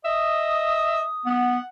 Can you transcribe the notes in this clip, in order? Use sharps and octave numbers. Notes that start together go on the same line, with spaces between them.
D#5 E5 D#6
B3 F#5